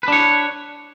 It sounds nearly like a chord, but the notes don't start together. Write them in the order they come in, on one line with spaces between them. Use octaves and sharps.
B4 D4 C#5